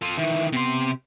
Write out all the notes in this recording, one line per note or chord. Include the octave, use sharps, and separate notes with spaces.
F4 A4
D#3 E3 E5
C3 B3 C6